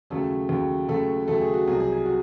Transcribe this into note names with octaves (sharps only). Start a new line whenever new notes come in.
D#2 C#3 F#3 A3 A4
D#2 C#3 F#3
D#2 C#3 F#3 A3 A4
D#2 C#3 F#3 A3 A4
G#4
F#4
C2 C3 F#3 G#4
G#4
G#4
F#4